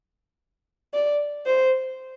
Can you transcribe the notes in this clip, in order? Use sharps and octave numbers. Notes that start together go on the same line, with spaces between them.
D5
C5